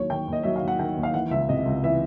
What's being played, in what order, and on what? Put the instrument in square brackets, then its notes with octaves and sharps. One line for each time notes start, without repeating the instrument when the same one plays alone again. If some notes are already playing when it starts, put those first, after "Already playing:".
Already playing: [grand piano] D#2 F#3 C#5
D#3 G5
D#2
D#5
F#3 E5
F5
D#2
F#5
D#3 G5
D#2
F5
E3 F#5
C#2 E5
C3 D#5
C#2
E3 E5